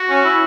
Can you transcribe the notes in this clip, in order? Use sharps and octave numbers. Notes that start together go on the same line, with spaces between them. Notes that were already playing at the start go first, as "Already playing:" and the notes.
Already playing: F#4
C#4
E4